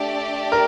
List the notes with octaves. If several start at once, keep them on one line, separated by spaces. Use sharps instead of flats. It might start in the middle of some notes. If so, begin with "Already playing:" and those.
Already playing: A3 D4 G4 D5
A#4